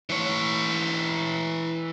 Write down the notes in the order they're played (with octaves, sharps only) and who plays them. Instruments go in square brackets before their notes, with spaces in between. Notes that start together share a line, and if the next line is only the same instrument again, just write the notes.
[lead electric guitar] E3 C#5